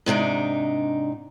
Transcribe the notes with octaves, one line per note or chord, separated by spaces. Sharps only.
G#2 C3 D4 D#4